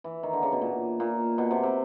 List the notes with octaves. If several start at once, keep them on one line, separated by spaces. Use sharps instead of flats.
E3
D#3
D3
C#3
B2
A#2
A#2
B2
C3
C3